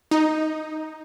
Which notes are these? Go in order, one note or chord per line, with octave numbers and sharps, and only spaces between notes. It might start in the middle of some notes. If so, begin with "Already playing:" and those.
D#4